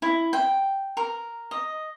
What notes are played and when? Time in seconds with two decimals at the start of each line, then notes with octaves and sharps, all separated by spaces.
0.02 E4
0.33 G5
0.97 A#4
1.51 D#5